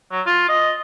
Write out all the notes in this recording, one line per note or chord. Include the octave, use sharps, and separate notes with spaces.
F#3
F4
D#5